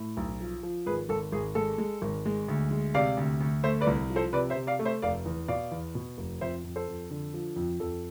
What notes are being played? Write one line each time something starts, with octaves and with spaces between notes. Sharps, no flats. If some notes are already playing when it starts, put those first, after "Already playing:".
Already playing: A2
B1
F3
F3
G#1 G#4 B4
G#1 A4
G#1 G#4
G#3 A4
G#3
G#1
G#3
D2
G#3
C3 D5 F5
D2
D2
A3 C5 E5
B4 D5
C2
F3
A4 C5
C3 B4 D5
C5 E5
C3
D5 F5
A3
C5 E5
F1 D5 F5
E2
B2 D5 F5
E2
B2
F1
F2 C5 E5
F2
A4 C5
F2
D3
F3
F2
F2 A4